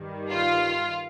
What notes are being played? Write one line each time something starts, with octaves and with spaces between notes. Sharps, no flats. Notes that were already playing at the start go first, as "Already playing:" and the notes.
Already playing: G2 D#3 G3
F4